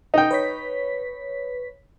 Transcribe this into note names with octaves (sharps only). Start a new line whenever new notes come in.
D#4 G5
B4 C#5 B6